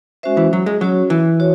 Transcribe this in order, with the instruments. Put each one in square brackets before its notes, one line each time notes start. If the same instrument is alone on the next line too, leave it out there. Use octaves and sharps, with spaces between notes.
[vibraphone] G#3 C#4 F#4 C5 E5
[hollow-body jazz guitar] E3
F#3
G#3
[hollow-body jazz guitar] F#3 [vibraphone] C#4 F#4 C#5
[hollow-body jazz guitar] E3
[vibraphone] F#4 C#5